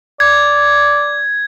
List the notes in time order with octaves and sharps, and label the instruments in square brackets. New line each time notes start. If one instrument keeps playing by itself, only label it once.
[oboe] D5 [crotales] G#6